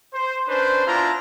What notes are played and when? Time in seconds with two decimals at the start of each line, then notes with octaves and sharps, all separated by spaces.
0.14 C5
0.49 C#4 D4 B4 C5
0.86 B3 D4 E4 F4 A#5